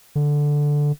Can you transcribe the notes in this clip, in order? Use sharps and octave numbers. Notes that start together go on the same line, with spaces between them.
D3